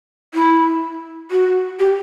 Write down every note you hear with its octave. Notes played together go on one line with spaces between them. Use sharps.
E4
F#4
G4